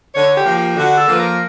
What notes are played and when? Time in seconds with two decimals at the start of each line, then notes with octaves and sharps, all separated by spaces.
0.14 D3 C#5
0.35 G4
0.45 F3 A#3
0.56 G4
0.77 D3 F#4
0.97 A4
1.08 F3 A#3 B4
1.18 A#4